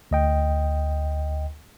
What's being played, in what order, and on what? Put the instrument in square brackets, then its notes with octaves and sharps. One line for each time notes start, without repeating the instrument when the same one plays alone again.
[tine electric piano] D2 D#5 G5